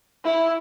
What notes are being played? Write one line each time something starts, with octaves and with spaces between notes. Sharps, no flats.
E4